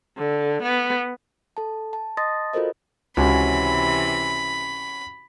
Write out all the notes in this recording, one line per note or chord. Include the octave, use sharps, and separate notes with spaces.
D3
B3
A4 A5
A5
D#5 A5 C6 D#6 A6 A#6
F4 F#4 A4 A#4 C5 D#5
C#2 C3 E3 C#4 F#4 G#5 B5